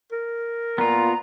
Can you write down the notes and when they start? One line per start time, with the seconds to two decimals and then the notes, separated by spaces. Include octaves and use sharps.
0.12 A#4
0.78 A#2 B3 F4 A#5